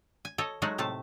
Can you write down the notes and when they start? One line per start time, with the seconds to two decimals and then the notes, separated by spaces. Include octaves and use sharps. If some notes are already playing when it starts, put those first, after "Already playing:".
0.25 G#5
0.38 A4 C#5 D#5
0.62 F#3 G#3 A3 D#4 F#4
0.78 A2 C3 A3 A5